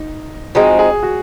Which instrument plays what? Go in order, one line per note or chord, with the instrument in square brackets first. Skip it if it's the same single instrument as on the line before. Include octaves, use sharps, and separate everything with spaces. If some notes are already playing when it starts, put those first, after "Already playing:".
Already playing: [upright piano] D#4
[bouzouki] F3 G#3 C4 D#4 [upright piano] F#4
[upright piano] G#4
F#4